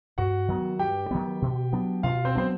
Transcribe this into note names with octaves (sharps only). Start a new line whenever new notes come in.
G2 F#4 F#5
D#3 F#3 B3
G2 G4 G5
D#3 F#3 B3
B2
F#3 B3 D4
B2 F4 F5
C4 C5
F#3 B3 D4 C5